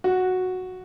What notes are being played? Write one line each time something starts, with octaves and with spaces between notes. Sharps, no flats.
F#4